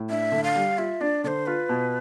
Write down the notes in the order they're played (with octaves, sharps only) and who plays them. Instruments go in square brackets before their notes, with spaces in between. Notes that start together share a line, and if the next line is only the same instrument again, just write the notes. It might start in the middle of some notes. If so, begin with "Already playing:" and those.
Already playing: [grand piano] A2
[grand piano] D4 [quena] E5
[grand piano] D3
[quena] F5
[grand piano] G3
[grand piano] F4 [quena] E5
[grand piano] D4 [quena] D5
[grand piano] D3 [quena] D5
[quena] C5
[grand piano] F4 [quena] B4
[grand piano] B2